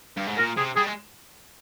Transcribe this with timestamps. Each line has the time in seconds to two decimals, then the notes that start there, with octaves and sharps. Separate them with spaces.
0.17 G2
0.27 G#2
0.38 A#2 A#4
0.57 C3 G#4
0.76 G3 G#4
0.87 G#3